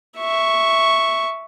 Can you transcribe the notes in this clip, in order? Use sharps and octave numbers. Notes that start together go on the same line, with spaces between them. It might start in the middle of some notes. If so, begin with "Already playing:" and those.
E5 C#6